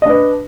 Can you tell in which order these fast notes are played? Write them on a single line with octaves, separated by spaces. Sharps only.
D#5 D4 B4